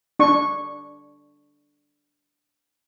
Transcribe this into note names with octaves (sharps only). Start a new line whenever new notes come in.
D4 C#6